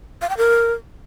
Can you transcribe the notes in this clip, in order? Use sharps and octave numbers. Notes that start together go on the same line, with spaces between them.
F5
G5
A#4